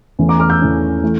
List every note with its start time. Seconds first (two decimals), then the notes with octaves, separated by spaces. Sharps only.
0.19 E2 E3 A3 C#4
0.29 A#5 D6
0.40 D6 F6
0.50 E6 G6
0.60 E2 E3 A3 C#4
1.03 E3 A3